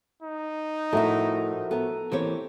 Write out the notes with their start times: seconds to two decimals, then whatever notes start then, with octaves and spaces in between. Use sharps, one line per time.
0.23 D#4
0.93 A2 F3 A3 E4 F#4 A#4 E5
1.71 B3 A4 A#5
2.12 E3 A#3 C4 G4 C#5